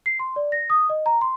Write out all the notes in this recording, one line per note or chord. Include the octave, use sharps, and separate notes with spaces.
C7
C6
D5
A#6
D#6
D#5
A#5
C6